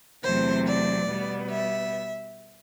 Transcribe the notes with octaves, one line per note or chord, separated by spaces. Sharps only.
E2 C3 F#3 A3 C4 C5
D5
B2 G3 B3
E5